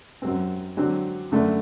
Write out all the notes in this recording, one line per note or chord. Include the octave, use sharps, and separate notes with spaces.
F#2 F#3 C4
D3 F#3 C4 F#4
F#2 D3 A3 D4